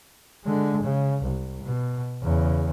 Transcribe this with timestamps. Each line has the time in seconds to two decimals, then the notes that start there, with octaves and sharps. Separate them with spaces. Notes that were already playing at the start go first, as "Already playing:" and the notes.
0.44 D3 G#3
0.83 C#3
1.23 C2
1.64 B2
2.23 E2 C#3